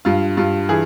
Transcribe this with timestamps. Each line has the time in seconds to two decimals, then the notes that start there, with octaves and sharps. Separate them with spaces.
0.05 G2 F4
0.37 G2 F4
0.69 E3 G#4